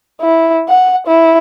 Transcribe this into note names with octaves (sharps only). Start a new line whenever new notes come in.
E4
F#5
E4